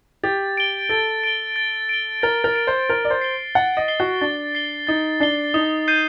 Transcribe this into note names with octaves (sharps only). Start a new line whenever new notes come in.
G4 A6
D7 G7
A4 A6
D7 G7
A6
D7 G7
A#4 A6
A#4
D7 G7
C5
A#4 A6
D5
C5
C7 G7
F#5 A6
D#5
C7 G7
F#4
D4 A6
C7 G7
D#4 A6
D4 C7 G7
D#4 D#6
G6 C7 D#7